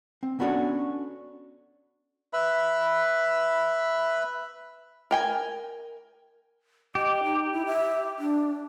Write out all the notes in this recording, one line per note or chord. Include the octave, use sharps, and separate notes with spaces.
C4
B3 C#4 D4 F#4 A4 C#5
B4 E5 B5
A#4 G5 G#5
G4 D#5
D#4
E4
E5
D4